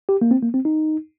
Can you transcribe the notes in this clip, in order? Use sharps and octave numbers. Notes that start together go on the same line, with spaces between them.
G4
A#3
C4
A#3
C4
D#4